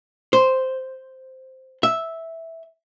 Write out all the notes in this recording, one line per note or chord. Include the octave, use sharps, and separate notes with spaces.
C5
E5